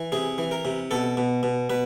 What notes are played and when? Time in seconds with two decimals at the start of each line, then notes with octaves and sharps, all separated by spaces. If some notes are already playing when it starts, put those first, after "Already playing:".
Already playing: E3
0.12 C3 G#4
0.38 E3
0.51 A#4
0.65 C3
0.91 B2 A4
1.17 B2
1.43 B2
1.70 B2 B4